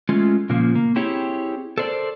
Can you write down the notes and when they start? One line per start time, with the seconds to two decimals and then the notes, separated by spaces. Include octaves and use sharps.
0.09 G#3 A3 C#4 F4
0.50 A#2 C#3 F3 A#3
0.75 A#3
0.96 C4 E4 G4 G#4 C#5
1.78 A4 A#4 C5 D5